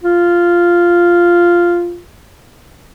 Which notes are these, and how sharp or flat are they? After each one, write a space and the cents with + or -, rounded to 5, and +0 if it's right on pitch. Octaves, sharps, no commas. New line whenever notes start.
F4 -5